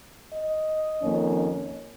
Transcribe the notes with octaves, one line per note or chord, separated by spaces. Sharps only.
D#5
F2 D#3 A#3 C#4